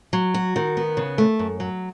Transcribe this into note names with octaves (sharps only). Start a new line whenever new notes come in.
F#3
F#4
D#3
B3
C#3
A3
F#2
F#3